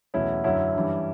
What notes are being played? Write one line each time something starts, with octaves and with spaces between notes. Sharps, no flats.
E2 B2 F#3 A3 C#4 E4
F#2 D3 F#3 C#4 E4
G2 E3 G3